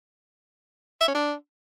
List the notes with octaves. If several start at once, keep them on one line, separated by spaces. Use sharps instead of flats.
E5
C#4
D4